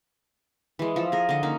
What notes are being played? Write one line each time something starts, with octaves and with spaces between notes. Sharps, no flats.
E3 G#3
F3 A4
G#4 A#4
D3 D#5
A#3 C#4 D#4